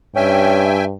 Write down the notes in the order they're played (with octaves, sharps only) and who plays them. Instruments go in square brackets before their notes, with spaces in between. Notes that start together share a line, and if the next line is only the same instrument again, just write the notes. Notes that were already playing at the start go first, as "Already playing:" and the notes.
[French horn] G2 [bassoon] C#4 [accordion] E5 G5 G#5